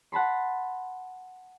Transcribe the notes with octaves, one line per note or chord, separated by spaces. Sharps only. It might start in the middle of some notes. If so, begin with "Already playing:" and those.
F#5 A5 B5 C6